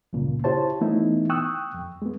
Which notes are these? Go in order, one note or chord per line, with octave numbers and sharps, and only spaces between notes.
C#2 G2 A#2 C#3
E4 G4 C5 C#5 A5
E3 A3 B3 D#4 E4
G5 C#6 D#6 E6 F#6
F2
G#3 B3